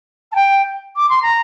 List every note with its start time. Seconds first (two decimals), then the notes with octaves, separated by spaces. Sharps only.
0.32 A5
0.35 G5
0.96 D6
1.09 C6
1.22 A#5